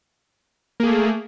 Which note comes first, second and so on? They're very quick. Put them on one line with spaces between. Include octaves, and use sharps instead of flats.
A#3 G#4 A3